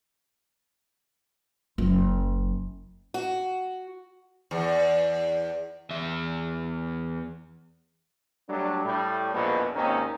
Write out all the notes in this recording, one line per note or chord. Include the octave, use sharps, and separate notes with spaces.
F#1 F#3
F#4
E2
E2 E5
F#3 G3 A3 D4
A2 G3
A#1 E2 B2
G#1 D#2 D#3 C4 C#4 D#4